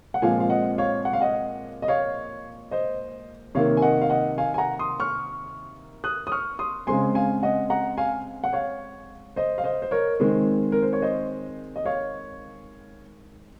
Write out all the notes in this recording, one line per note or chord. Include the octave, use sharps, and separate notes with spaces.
F#5
A#2 F3 G#3 C4 F5 G#5
F5
D#5 F#5
C#5 F5
F#5
F5
D#5 F#5
D#5
C#5 F5
C5 D#5
C3 D#3 A#3 C#5 F5
G#5
D#5 F#5
F5
D#5 F#5
F5 G#5
G#5
F#5 A#5
C6 D#6
C#6 F6
D#6 F#6
D#6
C#6 F6
C6 D#6
C#3 G#3 C4 G#5 C6
F5 G#5
D#5 F#5
F#5 A#5
F5 G#5
F#5
C#5 F5
C5 D#5
F5
C5 D#5
C5
A#4 C#5
D#3 G#3 C4
A#4
C5
C#5
C5 D#5
D#5
C#5 F5